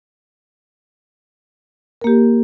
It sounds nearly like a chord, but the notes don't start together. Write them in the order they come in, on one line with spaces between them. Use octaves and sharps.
A#4 A#3 G4